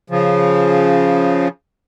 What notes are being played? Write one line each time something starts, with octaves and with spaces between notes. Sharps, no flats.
C#3 F3